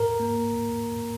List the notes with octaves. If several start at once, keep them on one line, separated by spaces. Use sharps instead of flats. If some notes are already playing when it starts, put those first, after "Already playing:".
Already playing: G#2 A#4
A#3